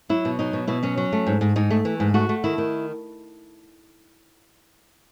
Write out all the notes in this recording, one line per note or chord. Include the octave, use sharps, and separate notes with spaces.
F#3 E4
B2
F#3 D#4
B2
B2 E4
F#3 C#4
F#3
A3
G#2
G#2
G#2 D#4
A3
E3
G#2
A3 F#4
A3
D#3 E4
D#3